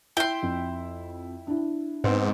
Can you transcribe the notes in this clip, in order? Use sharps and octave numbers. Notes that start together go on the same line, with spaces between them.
E4 G5 C6
F2
D4 E4
G#2 B3 C4